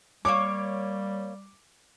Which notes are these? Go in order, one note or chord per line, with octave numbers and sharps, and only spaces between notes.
G3 A#3 B3 C#5 D6